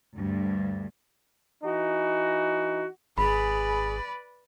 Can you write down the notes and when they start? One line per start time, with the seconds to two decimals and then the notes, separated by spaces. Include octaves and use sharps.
0.17 D2 G2
1.63 E3 D#4 F#4
3.18 G#1 G#4 B4 D5 B5